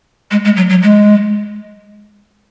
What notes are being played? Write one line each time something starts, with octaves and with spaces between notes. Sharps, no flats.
G#3
G#3
F#3
F#3
G#3